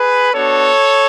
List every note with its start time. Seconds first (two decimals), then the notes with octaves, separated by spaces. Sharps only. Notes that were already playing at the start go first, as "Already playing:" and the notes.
Already playing: G#4 B4
0.33 B3 D4 F#4 A4 C#5